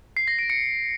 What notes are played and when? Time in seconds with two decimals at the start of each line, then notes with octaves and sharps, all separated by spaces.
0.17 C7
0.28 A#6
0.39 D7
0.50 C#7